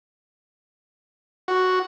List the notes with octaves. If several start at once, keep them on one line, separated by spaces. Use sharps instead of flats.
F#4